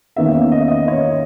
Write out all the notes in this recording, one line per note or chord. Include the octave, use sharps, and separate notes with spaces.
E2 D#3 A#3 C#4 E5
D#5
E5
D#5
C#5